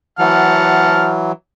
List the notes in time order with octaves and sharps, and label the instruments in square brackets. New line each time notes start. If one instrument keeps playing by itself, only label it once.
[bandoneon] E3 F#3 [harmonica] F#5 A5 F6